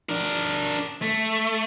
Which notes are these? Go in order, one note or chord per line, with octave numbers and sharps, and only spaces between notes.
D4 A#4
A3